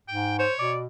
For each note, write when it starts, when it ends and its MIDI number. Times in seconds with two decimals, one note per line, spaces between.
0.08 0.45 44
0.08 0.35 79
0.39 0.53 72
0.39 0.71 73
0.59 0.86 47
0.59 0.77 74